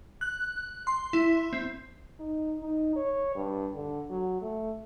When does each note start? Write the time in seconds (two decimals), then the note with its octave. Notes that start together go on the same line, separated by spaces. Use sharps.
0.21 F#6
0.87 C6
1.13 E4
1.53 C4
2.19 D#4
2.61 D#4
2.96 C#5
3.35 G2
3.75 D3
4.10 F#3
4.42 A3